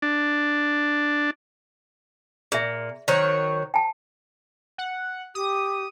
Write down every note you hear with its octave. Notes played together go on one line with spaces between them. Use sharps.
D4
A#2 G#4 E5
D#3 F#3 C5 C#5
G5 A5
F#5
G4 D#6